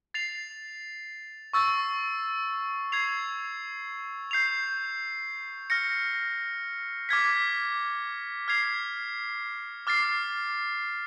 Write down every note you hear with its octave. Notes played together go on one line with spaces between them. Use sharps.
A6 C7 F7
C#6 E6 A6
G#6 C7 F7
G6 C7 F7
F6 A#6 C#7
D6 F6 G#6 B6
F6 G#6 C7 F7
D6 F6 A6 C7